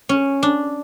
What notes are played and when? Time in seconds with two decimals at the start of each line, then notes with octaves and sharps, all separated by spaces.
0.09 C#4
0.43 D4